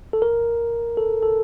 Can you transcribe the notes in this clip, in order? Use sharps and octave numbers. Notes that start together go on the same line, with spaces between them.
A4
A#4
A4
A4